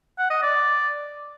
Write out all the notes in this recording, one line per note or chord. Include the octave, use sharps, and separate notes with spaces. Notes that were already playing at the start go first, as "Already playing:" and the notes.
F#5
D#5
D5